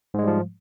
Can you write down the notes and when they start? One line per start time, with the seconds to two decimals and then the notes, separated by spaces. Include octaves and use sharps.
0.14 G#2
0.19 G#3
0.23 G3
0.28 F3